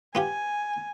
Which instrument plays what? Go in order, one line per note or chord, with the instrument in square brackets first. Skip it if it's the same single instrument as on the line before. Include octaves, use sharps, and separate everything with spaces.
[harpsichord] B3 F4 G4 [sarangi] G#5